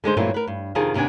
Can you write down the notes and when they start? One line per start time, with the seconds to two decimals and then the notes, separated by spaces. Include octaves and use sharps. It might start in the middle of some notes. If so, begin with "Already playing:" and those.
0.04 D3 G#3 D#4 C5
0.17 G2 A#2 E3 F#3 A3 C4
0.34 A#4 B4
0.47 G2
0.75 F2 C3 D#3 F4 G#4 A5
0.94 D#2 C3 B3 D4 G#5